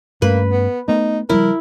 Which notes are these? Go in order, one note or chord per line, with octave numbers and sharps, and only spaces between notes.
G2 A3 A#3 C#4 B4
B3
A3 B3 D#4
C#3 F3 G3 E4 A#4